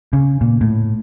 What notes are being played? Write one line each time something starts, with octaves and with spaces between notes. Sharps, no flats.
C#3
A#2
A2